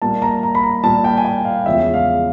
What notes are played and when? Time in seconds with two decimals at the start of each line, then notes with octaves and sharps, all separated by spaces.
0.02 A#2 G3 A#3 A5
0.22 A#5
0.43 A#5
0.55 B5
0.63 A#5
0.83 A#2 G3 A#3 A5
1.04 G5
1.17 G#5
1.25 G5
1.45 F5
1.66 E2 C#3 F3 G#3 E5
1.93 F5